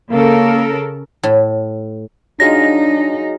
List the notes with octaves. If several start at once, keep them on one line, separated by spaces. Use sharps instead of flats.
C#3 A#3 A4 A#4
A2
F#3 G#3 D4 D#4 F4 A#6